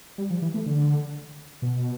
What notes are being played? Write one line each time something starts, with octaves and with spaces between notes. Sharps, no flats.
G3
F3
E3
A3
D3
B2